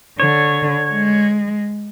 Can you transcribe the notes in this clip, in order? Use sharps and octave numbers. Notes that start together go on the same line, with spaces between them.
D3 C#5
G#3